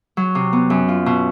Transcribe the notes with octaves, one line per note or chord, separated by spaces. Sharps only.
F#3
C3
B3
F#2
F4
B2